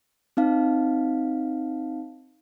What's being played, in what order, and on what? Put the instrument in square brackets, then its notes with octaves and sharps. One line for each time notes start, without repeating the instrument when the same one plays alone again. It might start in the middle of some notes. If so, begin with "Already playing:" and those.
[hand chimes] C4 D#4 F5